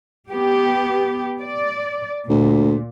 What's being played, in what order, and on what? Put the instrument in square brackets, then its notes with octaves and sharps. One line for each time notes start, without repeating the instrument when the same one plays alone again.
[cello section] B3 G4
D5
[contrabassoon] D2 [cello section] A#2